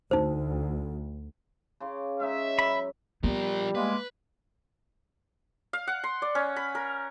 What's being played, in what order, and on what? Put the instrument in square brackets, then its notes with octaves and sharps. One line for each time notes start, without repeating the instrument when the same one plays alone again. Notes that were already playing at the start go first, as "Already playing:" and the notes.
[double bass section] D2 [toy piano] D#4 C5
[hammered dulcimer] C#3 C6 D6
[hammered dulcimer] G#3 C#4 D#4 [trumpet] E5
[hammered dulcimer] F#2 [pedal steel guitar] B5
[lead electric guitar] F3 A#4 [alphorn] G3 [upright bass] B3
[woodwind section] G#3 A#3 [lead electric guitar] B4
[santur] F5
F#5
C6
D5
C#4
B5
A#4